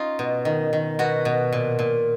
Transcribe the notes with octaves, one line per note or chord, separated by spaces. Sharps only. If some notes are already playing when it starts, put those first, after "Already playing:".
Already playing: C#4 D#4 F4
B2
D#3
D#3
B2 F#4
B2
A#2
A#2